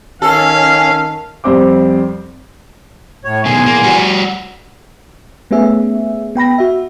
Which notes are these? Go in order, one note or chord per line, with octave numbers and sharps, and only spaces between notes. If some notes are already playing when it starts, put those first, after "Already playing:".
D#3 C#4 A4 F5
F2 G3 C4 C5 D6
A2 C#5
E2 B2 D#3 G#5 C6
A#3
G3 F#4
A3 B3 C#4 G#4 E5
B3 G5 B5 A#6
F#4 E5